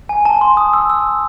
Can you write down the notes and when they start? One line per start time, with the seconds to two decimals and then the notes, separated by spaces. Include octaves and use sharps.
0.09 G#5
0.25 A5
0.41 C6
0.57 D#6
0.73 E6
0.90 E6